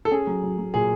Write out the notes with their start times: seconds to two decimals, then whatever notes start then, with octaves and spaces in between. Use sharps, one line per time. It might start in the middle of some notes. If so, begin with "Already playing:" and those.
0.05 A4
0.12 C#4 G#4
0.27 F#3
0.43 F#3
0.58 F#3
0.74 A#2 G#4